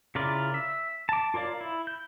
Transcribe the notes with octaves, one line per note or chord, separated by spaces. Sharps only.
C#3 E4 F4 A#4 D5
E5
A5 D6
F4 A#4 C#5 D5 F5
E4
G6